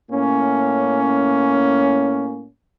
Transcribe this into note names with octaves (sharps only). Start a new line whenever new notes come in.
A2 A#3 C#4